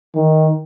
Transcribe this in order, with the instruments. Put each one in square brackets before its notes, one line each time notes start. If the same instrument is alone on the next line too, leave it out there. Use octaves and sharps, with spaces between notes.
[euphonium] D#3